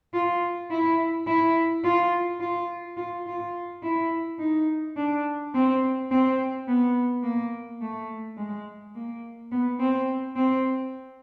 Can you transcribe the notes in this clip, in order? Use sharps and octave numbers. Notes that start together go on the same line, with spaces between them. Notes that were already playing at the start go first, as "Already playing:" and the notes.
F4
E4
E4
F4
F4
F4
F4
E4
D#4
D4
C4
C4
B3
A#3
A3
G#3
A#3
B3
C4
C4